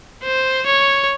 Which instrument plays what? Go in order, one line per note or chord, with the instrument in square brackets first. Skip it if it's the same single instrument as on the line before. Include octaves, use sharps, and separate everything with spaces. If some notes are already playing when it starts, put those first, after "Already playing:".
[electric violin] C5
C#5